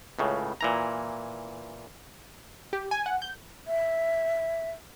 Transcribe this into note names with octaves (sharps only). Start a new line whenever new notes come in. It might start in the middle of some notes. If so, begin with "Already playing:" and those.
C#2 A2 C#3
A#2 E3 A#5
G4
G#5
F#5
G6
E5